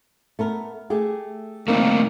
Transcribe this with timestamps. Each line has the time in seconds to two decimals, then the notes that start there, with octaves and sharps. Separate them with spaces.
0.39 A3 B3 A#4
0.90 A3 G4 G#4
1.68 D#3 G3 A3 A#3 C4 D#4